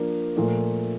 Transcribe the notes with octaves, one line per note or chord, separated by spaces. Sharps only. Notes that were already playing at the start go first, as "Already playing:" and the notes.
Already playing: F3 A#3 D4
A#2 F3 A3